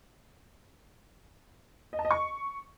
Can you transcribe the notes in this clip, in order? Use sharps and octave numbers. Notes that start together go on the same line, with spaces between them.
D#5
A5
D#5
C#6